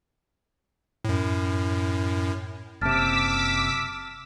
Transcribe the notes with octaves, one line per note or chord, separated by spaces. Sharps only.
F#2 A2
F#1 C3 A5 D6 E6 F6 A6 B6